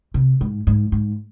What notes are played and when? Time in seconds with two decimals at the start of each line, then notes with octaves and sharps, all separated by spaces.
0.14 C3
0.41 G#2
0.67 G#2
0.92 G#2